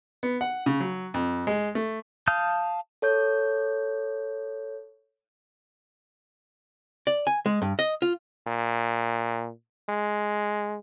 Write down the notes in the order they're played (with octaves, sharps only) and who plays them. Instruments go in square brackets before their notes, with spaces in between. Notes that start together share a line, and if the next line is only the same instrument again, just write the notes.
[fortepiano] B3
F#5
C#3
F#3
F2
G#3
A3
[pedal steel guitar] F5 A5 D#6 F6 G6
[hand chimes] A4 C#5 G6
[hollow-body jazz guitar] D5
G#5
G#3
G2
D#5
F4
[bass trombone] A#2
G#3